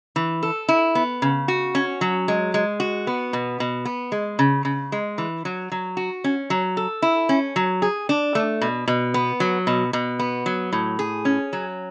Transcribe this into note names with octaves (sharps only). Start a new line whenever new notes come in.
E3
A4
E4
B3
C#3
F#4
C#4
F#3
G#3
G#3
F#4
B3
B2
B2
B3
G#3
C#3
C#3
G#3
E3
F#3
F#3
F#4
C#4
F#3
A4
E4
C#4
F#3
G#4
D4
A3
B2
B2
B3
F#3
B2
B2
B3
F#3
A2
G#4
C#4
F#3